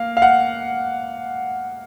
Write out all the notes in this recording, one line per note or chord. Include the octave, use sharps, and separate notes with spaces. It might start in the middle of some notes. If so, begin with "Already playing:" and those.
Already playing: A#3 F5
F5
F#5